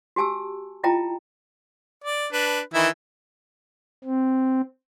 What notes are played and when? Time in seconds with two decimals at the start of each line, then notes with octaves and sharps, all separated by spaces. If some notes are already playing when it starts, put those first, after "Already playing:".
0.16 F#4 G4 G#5 A5 E6
0.84 E4 F4 D#5 G5 A5 A#5
2.04 D5
2.32 D4 B4
2.74 D#3 E3 E4
4.04 C4